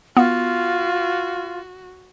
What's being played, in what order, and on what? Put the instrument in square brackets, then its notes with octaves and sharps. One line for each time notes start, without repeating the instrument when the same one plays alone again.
[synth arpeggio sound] B3 [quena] F4 [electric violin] F#4